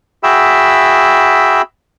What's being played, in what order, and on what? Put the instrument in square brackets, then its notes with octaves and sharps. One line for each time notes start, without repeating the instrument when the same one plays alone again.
[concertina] F#4 G#4 E5 G5 B5 E6